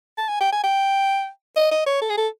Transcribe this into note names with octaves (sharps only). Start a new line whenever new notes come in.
A5
G#5
G5
G#5
G5
D#5
D#5
C#5
A4
G#4
A4